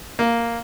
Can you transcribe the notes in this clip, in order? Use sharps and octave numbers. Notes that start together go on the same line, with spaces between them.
A#3